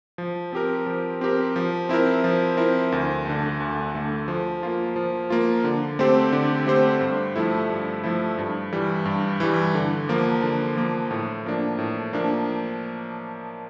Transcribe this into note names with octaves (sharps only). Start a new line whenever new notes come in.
F3
C4 G4 A#4
F3
C4 G4 A#4
F3
C4 E4 A#4
F3
C4 E4 A#4
D2
D3 A3
D2
D3 A3
F3
A#3 F4
F3
A#3 F4
D3
A3 C4 G4 C5
D3
A3 C4 G4 C5
G2
F3 A3 E4
G2
F3 A3 E4
G2
E3 G3
G2
E3 G3
D3
F3 A#3
D3
F3 A#3
A2
F3 A#3 D4
A2
F3 A#3 D4